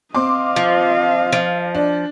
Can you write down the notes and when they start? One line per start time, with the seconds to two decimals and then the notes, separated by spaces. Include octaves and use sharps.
0.15 C4 D#5 F5 C6 D6
0.56 F3
1.32 F3
1.75 D4